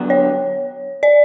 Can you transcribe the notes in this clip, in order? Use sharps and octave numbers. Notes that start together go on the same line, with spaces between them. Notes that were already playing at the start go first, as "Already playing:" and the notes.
Already playing: D3 F#3 B3
C#5
D5